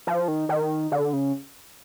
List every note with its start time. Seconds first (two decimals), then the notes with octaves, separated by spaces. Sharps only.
0.07 F3
0.28 D#3
0.49 D#3
0.92 D3
1.13 C#3